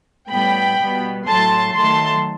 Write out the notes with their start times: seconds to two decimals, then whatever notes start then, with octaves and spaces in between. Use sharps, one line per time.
0.30 A2 G3 B3 G5 B5
0.78 B2 G3 B3
1.27 A2 F#3 A3 A5 C6
1.75 D#3 F#3 A3 A5 C6